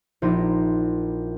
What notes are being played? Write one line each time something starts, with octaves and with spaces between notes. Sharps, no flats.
A#1 D#4 E4 G4 C6 A#6